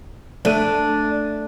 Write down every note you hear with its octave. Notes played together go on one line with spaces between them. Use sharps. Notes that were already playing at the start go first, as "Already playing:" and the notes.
A3 D4 F#6 D#7